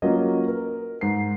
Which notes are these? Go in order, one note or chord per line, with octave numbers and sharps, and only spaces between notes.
F#3 A#3 C#4 F4 D#5
A#4
G#2 C7